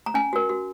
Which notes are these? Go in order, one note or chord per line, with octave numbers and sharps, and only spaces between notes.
A#5
C#4 G#5
F#4 A#4
F#4